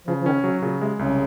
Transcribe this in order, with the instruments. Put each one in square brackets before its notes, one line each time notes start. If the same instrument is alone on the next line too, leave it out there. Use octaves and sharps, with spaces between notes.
[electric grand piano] C#3 [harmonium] F3
[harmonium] F3
[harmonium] D#3 [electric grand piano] C#4
[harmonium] C#3 [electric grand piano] F#3
[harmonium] A#2 [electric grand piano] C#3
[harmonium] C3 [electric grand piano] G#3
[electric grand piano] C2 [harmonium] C#3